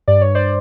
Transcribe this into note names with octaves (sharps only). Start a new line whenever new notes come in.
G2 D5
C#5
C5 D5